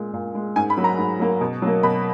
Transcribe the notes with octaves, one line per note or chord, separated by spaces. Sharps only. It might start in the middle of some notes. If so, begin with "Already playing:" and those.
Already playing: A#2 G#3
A#2
G#3
G#2 G#5
B5
F#3 A#3
A#5
G#2
F#3 A#3
B2
F#3 A#3
B2 B5